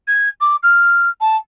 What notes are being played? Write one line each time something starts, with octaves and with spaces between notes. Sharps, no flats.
G#6
D6
F6
A5